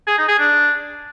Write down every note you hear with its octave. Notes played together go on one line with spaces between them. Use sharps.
G#4
D#4
G#4
D4